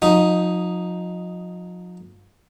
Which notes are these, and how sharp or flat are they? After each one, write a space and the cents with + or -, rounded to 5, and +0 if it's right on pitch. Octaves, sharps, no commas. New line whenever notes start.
F3 +45 D#4 +0